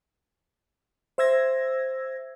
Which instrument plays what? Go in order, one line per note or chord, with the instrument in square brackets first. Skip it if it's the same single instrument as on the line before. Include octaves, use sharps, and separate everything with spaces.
[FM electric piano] C5 E5 E6 G#6 A#6